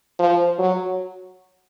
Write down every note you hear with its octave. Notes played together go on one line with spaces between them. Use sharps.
F3
F#3